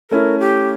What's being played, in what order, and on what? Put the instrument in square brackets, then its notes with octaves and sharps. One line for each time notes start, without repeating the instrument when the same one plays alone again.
[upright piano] A3 C#4 E4 [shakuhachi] A#4
[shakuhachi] G4